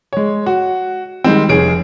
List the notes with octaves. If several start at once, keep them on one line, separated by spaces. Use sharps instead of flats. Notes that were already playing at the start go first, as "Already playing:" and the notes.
G#3 C#5
F#4
D#3 G3 G#3 C4
F1 G#4 C#5 D7